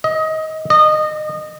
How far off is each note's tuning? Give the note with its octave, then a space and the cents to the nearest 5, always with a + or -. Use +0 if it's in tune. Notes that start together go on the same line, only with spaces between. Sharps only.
D#5 +20
D#5 -25